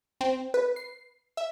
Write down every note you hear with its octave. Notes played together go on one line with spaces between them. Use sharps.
C4
B4
C7
E5